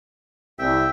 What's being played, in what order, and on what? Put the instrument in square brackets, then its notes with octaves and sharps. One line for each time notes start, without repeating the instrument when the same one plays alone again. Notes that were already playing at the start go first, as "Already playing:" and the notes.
[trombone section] C2 [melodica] E5 G5